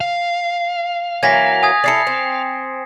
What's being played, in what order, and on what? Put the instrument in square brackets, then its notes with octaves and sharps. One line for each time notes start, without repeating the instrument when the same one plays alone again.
[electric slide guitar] F5
[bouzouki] E3 F#3 A#3 [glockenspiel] G#6 A#6 B6
[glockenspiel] G#5 D#6 G#6
[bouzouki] D4 E4 A4 [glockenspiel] A6 C7 C#7
[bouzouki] C4